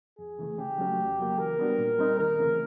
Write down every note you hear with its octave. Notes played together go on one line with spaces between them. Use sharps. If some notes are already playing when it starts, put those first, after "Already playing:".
F2 G#4
C#3 E3 A3
C#3 G4
F#3 A3 C#4 F#4
E2
C#3 F#3 A#3
E3 A#4
G3 B3 D4 F#4
A#2
G3 C4 D#4
D#2 A#4
C#3 E3 A3 C4